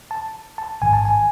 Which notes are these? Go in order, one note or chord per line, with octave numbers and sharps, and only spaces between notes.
A5
A5
A1 G#2 D#3 G#5
A5
G#5